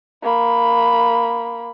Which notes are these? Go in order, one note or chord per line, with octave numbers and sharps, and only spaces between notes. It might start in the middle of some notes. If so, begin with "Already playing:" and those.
A#3 B5